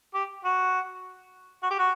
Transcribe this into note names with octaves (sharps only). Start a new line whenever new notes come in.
G4
F#4
F#4
G4
F#4